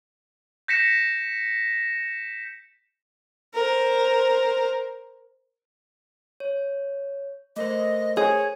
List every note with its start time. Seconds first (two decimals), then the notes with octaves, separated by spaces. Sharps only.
0.68 G6 A#6 B6 C#7 E7
3.54 A#4 C5
6.40 C#5
7.56 A3 A#4 C5 D#5
8.17 G#4 C#5